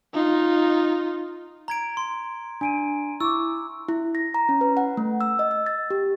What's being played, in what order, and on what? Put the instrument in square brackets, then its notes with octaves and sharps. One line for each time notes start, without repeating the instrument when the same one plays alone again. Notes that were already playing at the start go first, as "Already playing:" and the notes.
[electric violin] D#4 F4
[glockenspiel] A#5 G#6 D7
C6
[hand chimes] D4 [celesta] G#5 D7 D#7
[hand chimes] E4 [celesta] C#6 D6 [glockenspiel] E6
[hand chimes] E4
A#6
A#5
C#4
B4
F#5
A3
E6
D#5
E6
A6
G4